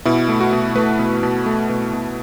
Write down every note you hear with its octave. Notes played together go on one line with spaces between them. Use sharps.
B2 E4
A3
F#4
B2
A3 B4
B2
B2
A3
B2
B2